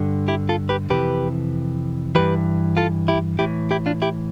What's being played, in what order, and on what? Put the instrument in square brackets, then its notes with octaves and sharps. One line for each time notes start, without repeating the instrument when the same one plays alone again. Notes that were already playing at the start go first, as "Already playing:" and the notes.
Already playing: [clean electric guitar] G2 D3
E4 G4
F4 A4
G4 B4
F2 C3 E3 G4 B4
G2 E3 G4 B4
F4 A4
E4 G4
A2 E3 E4 G4
E4 G4
D4 F4
E4 G4